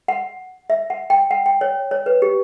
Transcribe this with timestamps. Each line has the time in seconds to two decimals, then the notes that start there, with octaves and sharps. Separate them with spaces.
0.08 F#5
0.70 E5
0.90 F#5
1.10 G5
1.31 F#5
1.46 G5
1.61 C#5
1.91 C#5
2.06 B4
2.22 G4